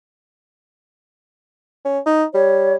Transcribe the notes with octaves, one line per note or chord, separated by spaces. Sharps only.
C#4
D#4
G3 C#5